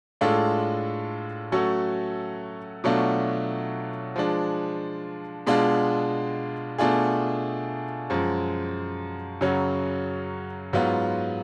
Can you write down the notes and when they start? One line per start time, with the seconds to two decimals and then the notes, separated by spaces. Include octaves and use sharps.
0.21 A2 G#3 D4 F4 A4
1.52 F#3 A3 C#4 F#4 A4
2.84 B2 F#3 A3 D4 F4
4.16 F3 G#3 D4
5.47 B2 G#3 D4 F4
6.78 B2 A3 D4 F4 G#4
8.10 F#2 F3 G#3
9.41 F#2 C#3 F#3 C#4
10.73 G#2 F#3 B3 F4